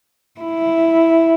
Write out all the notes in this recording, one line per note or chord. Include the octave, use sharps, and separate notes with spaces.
E4